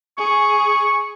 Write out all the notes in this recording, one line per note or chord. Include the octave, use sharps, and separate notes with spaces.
G#4 C#6